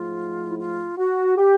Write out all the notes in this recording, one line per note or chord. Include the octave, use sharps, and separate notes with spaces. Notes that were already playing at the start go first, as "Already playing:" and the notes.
Already playing: G#2 F3 A3 F4
E4
F4
F#4
G4